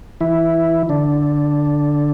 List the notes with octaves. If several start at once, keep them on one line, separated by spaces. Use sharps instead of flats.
E3 E4
D3 D4